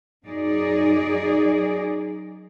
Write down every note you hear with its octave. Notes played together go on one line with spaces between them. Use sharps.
F#2 F#3 D#4 G#4 D5